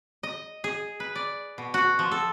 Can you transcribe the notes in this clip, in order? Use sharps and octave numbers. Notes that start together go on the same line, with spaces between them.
D#5
G#4
B4
D5
B2
F#4
F3
A4